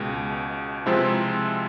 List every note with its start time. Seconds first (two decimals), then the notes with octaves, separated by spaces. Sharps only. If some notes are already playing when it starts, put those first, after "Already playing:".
Already playing: C#2 B2 G#3
0.86 C3 F3 G#3 C4 E4